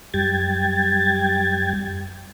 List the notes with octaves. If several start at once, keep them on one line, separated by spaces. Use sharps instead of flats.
F#2 G3 G5 G#6 A6